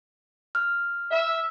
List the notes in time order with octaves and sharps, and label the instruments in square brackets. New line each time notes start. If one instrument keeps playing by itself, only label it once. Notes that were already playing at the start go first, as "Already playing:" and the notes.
[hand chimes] F6
[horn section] E5